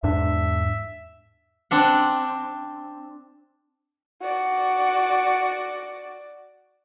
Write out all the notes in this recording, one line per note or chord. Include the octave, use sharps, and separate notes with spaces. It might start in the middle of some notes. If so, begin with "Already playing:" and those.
E2 G#2 D4 E5
C4 D4 F#5
F#4 D5